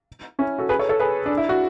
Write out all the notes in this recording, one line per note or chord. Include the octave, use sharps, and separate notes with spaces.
C#4 E4
F#4 A4
G#4 B4
A4 C#5
A4 C#5
G#4 B4
D4
E4
F#4